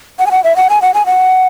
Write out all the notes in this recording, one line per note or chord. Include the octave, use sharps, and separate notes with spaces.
F#5
G#5
F#5
E5
F#5
G#5
F#5
G#5
F#5